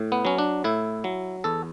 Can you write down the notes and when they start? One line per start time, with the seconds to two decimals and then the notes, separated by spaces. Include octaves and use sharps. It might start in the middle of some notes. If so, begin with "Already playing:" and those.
Already playing: A2
0.12 B3
0.25 F#3 C#4
0.38 D4
0.64 A2 E4
1.04 F#3
1.44 E2 A4